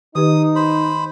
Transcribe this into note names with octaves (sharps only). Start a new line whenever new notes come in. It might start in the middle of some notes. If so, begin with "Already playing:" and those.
D#3 D#4 G4 B4 D#6
C5 B5